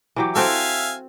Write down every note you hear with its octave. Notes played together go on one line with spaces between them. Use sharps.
E3 F#3 G4
C4 F#4 A4 E5 F5 G#5